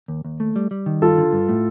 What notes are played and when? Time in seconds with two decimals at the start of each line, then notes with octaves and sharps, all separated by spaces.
0.08 D#2
0.25 D#2
0.40 A3
0.56 G3
0.71 G3
0.86 D#3
1.02 G2 F4 A4
1.18 D3
1.33 G2
1.49 A2